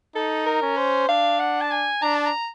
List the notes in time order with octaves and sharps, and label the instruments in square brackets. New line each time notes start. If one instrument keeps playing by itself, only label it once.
[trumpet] D#4 [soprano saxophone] A4
[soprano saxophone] A#4
[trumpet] C#4
[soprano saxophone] C5
[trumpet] D4 [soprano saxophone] F5
[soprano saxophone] F#5
A5
G#5
[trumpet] D4 [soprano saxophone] A#5
[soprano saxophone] A5
A#5